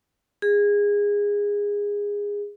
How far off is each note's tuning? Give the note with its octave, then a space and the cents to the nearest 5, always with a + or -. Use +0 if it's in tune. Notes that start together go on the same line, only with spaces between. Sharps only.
G#4 -20